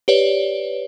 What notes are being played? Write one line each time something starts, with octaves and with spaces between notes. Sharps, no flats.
G4 B4 C#5 D5